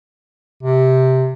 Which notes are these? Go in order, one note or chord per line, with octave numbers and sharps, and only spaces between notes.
C3